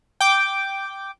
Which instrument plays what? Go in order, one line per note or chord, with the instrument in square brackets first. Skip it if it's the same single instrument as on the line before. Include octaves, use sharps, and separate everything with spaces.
[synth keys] G5 D6